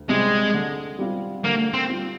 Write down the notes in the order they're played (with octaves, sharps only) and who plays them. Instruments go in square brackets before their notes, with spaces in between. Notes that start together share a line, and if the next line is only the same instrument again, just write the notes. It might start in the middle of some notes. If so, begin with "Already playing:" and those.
Already playing: [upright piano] D2
[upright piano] C3 G3 C4 [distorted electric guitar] G#3
[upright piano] D3
G3 C4 F4
[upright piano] D3 [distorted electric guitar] A#3
[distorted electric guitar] C4
[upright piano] G3 C4 F4